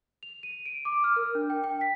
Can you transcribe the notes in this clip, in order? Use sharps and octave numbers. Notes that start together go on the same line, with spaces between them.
F7
D#7
D7
D6
F6
A#4
D4
G5
G5
B6